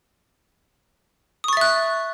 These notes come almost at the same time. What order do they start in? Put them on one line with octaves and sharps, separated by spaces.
D#6 C#6 A6 E5 F#6